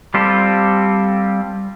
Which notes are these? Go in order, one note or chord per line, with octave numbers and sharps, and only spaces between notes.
G3 C4 F4 G4 A4